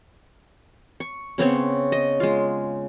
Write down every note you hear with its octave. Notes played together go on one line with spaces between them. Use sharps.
C#6
C#3 B3 C4 C#5
D#5
G#3 F4